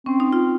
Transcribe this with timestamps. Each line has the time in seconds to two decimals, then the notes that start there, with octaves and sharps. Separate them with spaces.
0.06 C4 C#4
0.20 D#4
0.33 F4